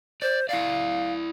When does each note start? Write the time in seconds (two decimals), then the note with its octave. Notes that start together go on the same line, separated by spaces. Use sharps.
0.22 C5 D5
0.49 E4 D5 F5